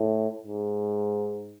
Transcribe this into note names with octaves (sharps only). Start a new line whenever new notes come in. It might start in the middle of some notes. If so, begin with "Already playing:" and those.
Already playing: A2
G#2